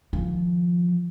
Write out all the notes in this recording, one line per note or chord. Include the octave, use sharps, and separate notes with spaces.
D#3 F3